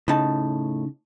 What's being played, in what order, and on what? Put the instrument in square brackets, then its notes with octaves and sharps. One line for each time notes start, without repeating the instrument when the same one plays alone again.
[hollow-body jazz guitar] A2 D#4 A5 [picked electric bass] C#3